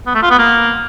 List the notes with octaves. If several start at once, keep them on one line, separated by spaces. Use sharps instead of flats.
B3
A3
F4
B3
A#3